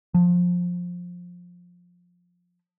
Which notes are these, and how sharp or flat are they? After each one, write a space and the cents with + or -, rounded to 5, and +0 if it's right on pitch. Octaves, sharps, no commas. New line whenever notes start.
F3 +20